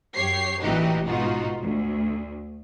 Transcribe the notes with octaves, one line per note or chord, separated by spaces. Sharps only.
F#2 G4 C#5 C7
A1 A#2 E3 D#4 F#4 G4
G#2 B2 D#4 F4 F#4
D2